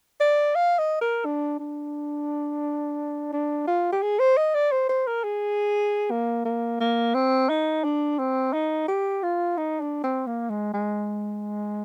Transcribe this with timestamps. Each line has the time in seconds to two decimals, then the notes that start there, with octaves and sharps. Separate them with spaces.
0.20 D5
0.55 F5
0.78 D#5
1.01 A#4
1.25 D4
1.59 D4
3.33 D4
3.67 F4
3.92 G4
4.02 G#4
4.19 C5
4.37 D#5
4.55 D5
4.72 C5
4.89 C5
5.07 A#4
5.23 G#4
6.11 A#3
6.45 A#3
6.80 A#3
7.14 C4
7.49 D#4
7.84 D4
8.19 C4
8.53 D#4
8.88 G4
9.23 F4
9.58 D#4
9.81 D4
10.04 C4
10.27 A#3
10.50 G#3
10.73 G#3